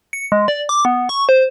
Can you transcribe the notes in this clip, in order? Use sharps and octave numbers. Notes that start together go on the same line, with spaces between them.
C#7
G#3
D5
D6
B3
C#6
C5